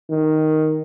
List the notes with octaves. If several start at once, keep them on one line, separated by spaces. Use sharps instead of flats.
D#3